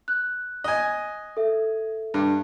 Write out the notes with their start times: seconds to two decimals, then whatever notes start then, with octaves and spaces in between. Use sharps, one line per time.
0.08 F#6
0.64 D#5 G#5
1.37 A4 E5
2.14 G2